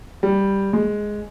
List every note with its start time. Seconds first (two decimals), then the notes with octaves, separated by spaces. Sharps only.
0.23 G3
0.73 G#3